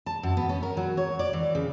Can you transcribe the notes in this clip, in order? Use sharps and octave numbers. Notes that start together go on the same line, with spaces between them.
A5
F#2
B3
C#4
A#4
F#3
C#5
D5
E3
C#3